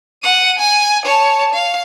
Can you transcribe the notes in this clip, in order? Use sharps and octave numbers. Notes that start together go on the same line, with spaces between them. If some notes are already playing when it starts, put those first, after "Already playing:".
F#5 D#7
G#5
C#5 A5
F5